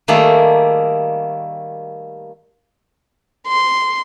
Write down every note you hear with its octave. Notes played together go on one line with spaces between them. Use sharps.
D#3 G3 A3 A#3 G#4
C6